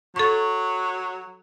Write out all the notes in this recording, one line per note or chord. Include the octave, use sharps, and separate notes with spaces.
F#3 A4 C#6